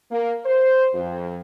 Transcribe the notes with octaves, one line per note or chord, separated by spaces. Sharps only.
A#3
C5
F2